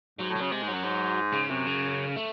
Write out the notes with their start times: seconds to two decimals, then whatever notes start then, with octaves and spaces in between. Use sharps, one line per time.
0.19 G#2 F#3
0.30 A2
0.35 F#3
0.41 C#3
0.52 C3 G#3
0.63 G#2
0.68 F#3
0.74 F#2
0.84 G#2
1.33 C#3
1.49 F#2 C3
1.66 C#3
2.16 A3